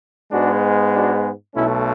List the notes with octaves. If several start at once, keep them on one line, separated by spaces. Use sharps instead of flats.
G#2 G#3 B3 D4 F#4
D4 F#4
B1 B2 A3 C#4 E4